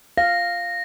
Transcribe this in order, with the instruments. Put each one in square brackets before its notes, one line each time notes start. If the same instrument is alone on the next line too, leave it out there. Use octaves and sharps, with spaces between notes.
[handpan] F5 [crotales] A#6